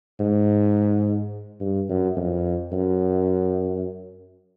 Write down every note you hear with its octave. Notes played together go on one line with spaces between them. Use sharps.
G#2
G2
F#2
F2
F#2